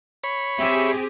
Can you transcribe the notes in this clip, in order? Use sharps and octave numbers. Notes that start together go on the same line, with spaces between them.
C#5 B5
C4 G4 G#4 E5